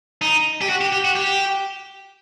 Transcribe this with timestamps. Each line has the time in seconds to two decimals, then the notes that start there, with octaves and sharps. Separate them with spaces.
0.22 D#4
0.61 G4
0.69 F#4
0.81 G4
0.93 G4
1.05 F#4
1.16 G4